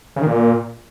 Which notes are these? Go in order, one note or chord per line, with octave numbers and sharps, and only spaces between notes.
C#3
D#3
A#2